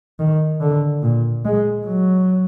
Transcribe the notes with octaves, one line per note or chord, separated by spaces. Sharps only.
D#3
D3
A#2
G#3
F#3